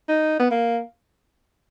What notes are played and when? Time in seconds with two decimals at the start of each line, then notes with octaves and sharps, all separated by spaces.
0.09 D#4
0.40 B3
0.51 A#3